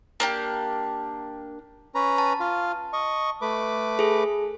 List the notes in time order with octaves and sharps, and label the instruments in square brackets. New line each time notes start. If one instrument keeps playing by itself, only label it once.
[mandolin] A#3 D4 G4
[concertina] C#4 B4 A#5
[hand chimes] A5
[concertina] F4 F5
D#5 C#6
A3 B4 D6
[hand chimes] G#4 A4